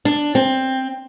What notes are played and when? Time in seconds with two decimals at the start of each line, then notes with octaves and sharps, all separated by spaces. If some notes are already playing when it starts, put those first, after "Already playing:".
0.05 D4
0.35 C4